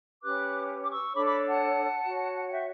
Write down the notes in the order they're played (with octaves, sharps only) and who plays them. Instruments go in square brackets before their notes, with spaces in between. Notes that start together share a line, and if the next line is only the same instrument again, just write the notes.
[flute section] C#4 G4 B4 D6 F#6
D6
C#6 E6
D4 A4 C#5 B5 D6
B5 D6
F#5 A5
F#4 C#5
F#5
E5 G5